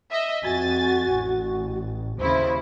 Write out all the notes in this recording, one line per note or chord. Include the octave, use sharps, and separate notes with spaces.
D#5 E5
F2 F#4 G#5 A6
A1
D#2 C#3 E4 C5